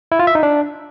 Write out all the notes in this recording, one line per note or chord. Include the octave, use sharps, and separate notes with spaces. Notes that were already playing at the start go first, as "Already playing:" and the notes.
E4
F4
E5
D#4
D4